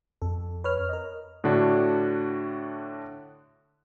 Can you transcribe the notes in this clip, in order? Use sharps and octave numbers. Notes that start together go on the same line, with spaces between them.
F2 A4
B4 C#5 F6
A#4 D#5
A2 D3 D4 F#4